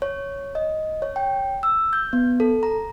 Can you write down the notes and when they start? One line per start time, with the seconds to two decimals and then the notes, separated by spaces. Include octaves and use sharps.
0.02 C#5
0.55 D#5
1.02 C#5
1.16 G5
1.63 E6
1.93 G6
2.13 B3
2.40 A4
2.63 A#5